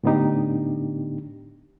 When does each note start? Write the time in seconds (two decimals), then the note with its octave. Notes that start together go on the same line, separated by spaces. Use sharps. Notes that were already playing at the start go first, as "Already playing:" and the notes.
0.04 A2 D3 B3 D4 D#4 G4